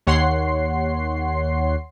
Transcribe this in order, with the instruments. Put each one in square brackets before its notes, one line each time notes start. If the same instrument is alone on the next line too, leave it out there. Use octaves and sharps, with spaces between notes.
[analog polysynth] D#2 C#5 F#5 C6 C7